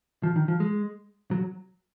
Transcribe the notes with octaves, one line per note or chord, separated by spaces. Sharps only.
F3
D#3
F3
G#3
F#3